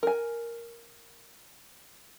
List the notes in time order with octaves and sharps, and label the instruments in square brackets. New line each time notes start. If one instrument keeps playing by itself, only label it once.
[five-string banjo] A#4 G#5